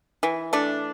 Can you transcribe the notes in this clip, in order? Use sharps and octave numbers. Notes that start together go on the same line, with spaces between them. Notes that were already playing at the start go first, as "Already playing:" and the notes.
E3
A3 D4